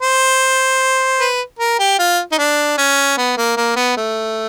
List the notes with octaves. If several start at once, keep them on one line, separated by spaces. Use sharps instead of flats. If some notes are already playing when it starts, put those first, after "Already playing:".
C5
B4
A#4
G4
F4
D#4
D4
C#4
B3
A#3
A#3
B3
A3